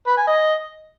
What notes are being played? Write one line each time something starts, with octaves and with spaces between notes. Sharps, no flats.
B4
G#5
D#5